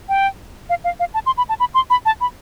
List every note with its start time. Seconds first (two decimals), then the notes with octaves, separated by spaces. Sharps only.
0.09 G5
0.69 F5
0.84 F5
1.00 F5
1.14 A5
1.26 C6
1.37 B5
1.49 A5
1.60 B5
1.74 C6
1.90 B5
2.05 A5
2.21 B5